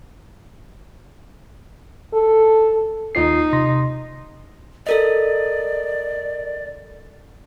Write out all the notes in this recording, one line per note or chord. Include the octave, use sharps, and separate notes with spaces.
A4
D#2 D#4 F4 C7
C3 C6 A#6
A4 A#4 D5 D#5